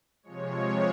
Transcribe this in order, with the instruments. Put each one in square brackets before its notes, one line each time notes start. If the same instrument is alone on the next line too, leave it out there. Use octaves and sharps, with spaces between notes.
[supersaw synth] C3 F3 G#3 C#5